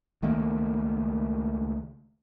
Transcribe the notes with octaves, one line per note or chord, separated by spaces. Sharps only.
C#2 D#3 A3 A#3